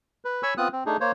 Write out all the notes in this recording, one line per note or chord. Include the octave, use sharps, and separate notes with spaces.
B4
C#5 G#5 B5 C#6 E6
B3 C4 F4 D#6 F#6
C4
A3 D4 D#4 G#4
A#3 C5 C#5